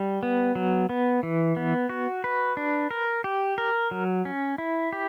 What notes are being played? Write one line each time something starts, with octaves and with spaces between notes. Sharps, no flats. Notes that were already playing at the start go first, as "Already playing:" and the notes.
Already playing: G3
B3
F#3
B3
E3
B3
F#4
B4
D4
A#4
G4
A#4
F#3
C#4
E4
G4